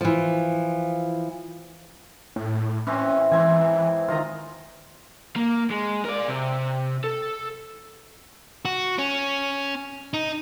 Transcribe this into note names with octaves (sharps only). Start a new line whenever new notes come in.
E3 F3
A2
E3 C4 C#4
G#2 E3 C4 G#5
D#3 F4 D#5 A#5
A#3
G#3
A#4 D5
C3
A4
F#4
C#4
D#4